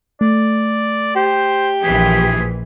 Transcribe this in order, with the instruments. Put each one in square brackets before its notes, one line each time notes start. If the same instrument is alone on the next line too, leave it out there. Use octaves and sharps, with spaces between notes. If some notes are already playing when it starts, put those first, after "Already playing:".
[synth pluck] A3 [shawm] D5
[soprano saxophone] G4 [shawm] C5
[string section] A#1 E3 B6 [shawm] G#4 [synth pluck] G5